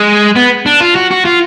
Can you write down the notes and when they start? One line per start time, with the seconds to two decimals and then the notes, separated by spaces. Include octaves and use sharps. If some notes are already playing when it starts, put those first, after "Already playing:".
Already playing: G#3
0.36 B3
0.66 D4
0.80 F4
0.95 F#4
1.11 F#4
1.25 F4